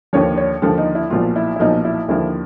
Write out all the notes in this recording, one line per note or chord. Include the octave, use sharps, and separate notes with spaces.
D#2 D3 F3 C#5
C#5
D#2 D3 F3 A4
D#4
E4
B1 A#2 F3 F4
E4
E4
B1 A#2 F3 D#4
E4
D#2 D3 F3 E4